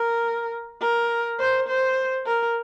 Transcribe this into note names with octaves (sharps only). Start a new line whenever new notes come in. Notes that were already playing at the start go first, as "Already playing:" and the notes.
Already playing: A#4
A#4
C5
C5
A#4